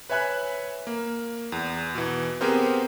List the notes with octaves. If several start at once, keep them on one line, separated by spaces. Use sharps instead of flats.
B4 C#5 E5 G#5 B5 F#6
A#3
E2
B2 E3
B3 C4 G4 G#4 A#4 C5